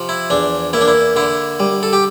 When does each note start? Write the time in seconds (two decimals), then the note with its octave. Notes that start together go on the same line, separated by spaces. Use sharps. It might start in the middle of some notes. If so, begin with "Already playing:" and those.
Already playing: C3 F3
0.09 E4
0.30 E2 D4
0.73 A#3 E4
0.81 D4
0.88 E4
1.16 D3 E4
1.60 G3
1.83 A4
1.93 G4